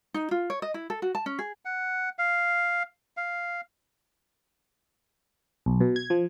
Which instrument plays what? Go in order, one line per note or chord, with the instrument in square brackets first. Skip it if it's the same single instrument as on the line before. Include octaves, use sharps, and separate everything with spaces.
[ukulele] D#4
F4
C#5
D#5
E4
A4
F#4
A5
C#4
G#4
[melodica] F#5
F5
F5
[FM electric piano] B1
B2
G#6
F3